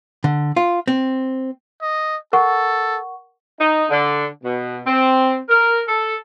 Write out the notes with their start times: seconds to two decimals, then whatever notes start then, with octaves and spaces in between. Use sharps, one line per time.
0.24 D3
0.56 F4
0.88 C4
1.82 D#5
2.33 A4 A#4 F#5 C#6
3.60 D#4
3.90 D3
4.44 B2
4.87 C4
5.49 A#4
5.88 A4